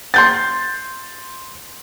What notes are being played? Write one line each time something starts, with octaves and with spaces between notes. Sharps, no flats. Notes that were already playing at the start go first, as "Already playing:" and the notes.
C6 G6 A6